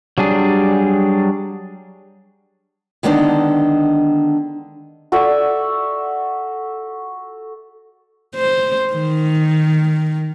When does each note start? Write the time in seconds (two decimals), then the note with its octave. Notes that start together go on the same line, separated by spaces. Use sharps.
0.18 F#3 G3 D4 G#4
3.03 D3 D#3 G#3 B3 D4 D#4
5.12 F#4 A4 D5 E5
8.35 C5
8.94 D#3